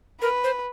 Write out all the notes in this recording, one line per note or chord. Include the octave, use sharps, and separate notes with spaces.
A#4 B4
C5